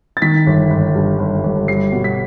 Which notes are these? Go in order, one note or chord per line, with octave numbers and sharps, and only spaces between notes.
A6
D#3 B6
G1
G1
G2
G1
G1
G3 C7
B2
B6